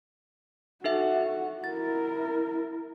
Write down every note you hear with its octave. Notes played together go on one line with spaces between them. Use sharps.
D#4 F#4 A4 E5
E4 A#4 A6